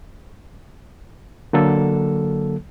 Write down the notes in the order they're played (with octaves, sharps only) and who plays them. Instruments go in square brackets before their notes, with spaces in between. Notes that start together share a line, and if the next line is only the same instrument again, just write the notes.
[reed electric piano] D3 F#3 A#3 A4